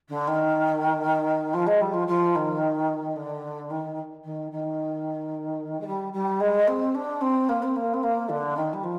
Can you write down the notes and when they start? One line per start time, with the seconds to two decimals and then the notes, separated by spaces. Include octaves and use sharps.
0.08 D3
0.27 D#3
1.53 F3
1.66 G#3
1.81 G3
1.93 F3
2.07 F3
2.35 D#3
3.16 D3
3.70 D#3
4.23 D#3
4.51 D#3
5.80 G#3
5.86 G3
6.12 G3
6.40 G#3
6.67 C4
6.94 D4
7.21 C4
7.48 A#3
7.62 C4
7.75 A#3
7.93 C4
8.03 A#3
8.29 D3
8.56 D#3
8.73 G3
8.83 F3